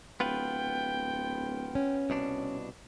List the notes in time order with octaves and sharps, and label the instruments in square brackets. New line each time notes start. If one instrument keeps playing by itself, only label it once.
[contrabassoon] D1 [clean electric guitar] B3 F4 B4 [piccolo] G5
[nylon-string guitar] C#4
[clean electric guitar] C2 B2 D4